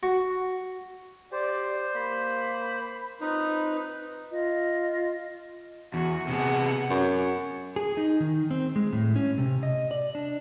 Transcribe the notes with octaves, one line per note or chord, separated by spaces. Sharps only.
F#4
G4 C5 D5
A#3 B5
C4 D#4 F4 B4
F4 D#5
E2 F#4
C3 B3 G#4 F#5
F#2
G#4
D#4
D#3
C4
G#3
A2
C#4
C3
D#5
D5
D4